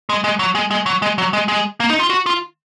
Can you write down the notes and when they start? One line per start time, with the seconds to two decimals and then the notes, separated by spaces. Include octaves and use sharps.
0.09 G#3
0.24 G#3
0.39 F#3
0.55 G#3
0.71 G#3
0.86 F#3
1.02 G#3
1.18 F#3
1.33 G#3
1.48 G#3
1.80 A#3
1.90 D#4
2.00 F4
2.10 F#4
2.26 F4